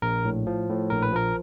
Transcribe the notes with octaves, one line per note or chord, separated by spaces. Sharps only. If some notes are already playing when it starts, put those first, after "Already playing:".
A#1 A#4
A2
F3
A2
A#1 A#4
B4
F3 A#4